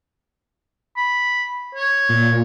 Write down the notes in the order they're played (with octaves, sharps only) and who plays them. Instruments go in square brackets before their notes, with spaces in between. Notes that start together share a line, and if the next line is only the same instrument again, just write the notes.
[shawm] B5
C#5
[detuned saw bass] A#2